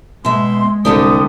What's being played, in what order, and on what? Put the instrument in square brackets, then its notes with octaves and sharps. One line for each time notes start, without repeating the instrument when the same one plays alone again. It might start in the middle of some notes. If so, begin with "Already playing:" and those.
[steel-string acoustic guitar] B2 E5 [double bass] G#3 [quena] C6
[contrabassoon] C2 [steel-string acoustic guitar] D3 A3 G4 [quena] D#6